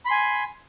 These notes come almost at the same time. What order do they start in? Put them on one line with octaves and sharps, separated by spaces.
B5 C6 G#5